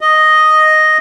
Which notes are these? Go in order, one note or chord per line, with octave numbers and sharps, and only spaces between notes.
D#5